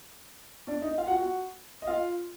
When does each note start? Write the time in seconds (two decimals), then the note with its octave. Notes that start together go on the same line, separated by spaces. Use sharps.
0.67 D4 D5
0.82 D#4 D#5
0.98 F4 F5
1.07 F#4 F#5
1.17 F#4 F#5
1.82 D#5
1.87 F4 F5